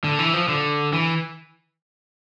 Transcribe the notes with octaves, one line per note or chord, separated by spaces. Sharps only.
D3
E3
F3
D3
E3